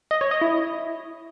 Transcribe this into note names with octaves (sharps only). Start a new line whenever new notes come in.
D#5
C#5
D#5
E4